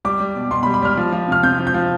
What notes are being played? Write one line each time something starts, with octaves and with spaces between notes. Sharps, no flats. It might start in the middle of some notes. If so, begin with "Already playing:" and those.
G3 D6
G3
B2
B2 C6
B5
G3
B5
G3 F6
F3
F3
C3 F6
C3 G6
F3
G6
F3